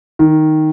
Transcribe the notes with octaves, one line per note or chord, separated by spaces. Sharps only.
D#3